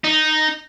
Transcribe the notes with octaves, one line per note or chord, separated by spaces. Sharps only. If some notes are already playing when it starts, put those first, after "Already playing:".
D#4